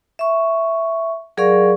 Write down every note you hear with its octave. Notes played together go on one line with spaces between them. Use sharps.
E5 C#6
F#3 G#4 A#4 D5 F5 C#6